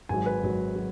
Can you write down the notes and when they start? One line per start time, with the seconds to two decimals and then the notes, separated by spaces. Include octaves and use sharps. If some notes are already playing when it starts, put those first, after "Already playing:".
0.09 G#1 G#2 F#3 G#5
0.26 B4
0.43 G#1 G#2 F#3
0.75 F#3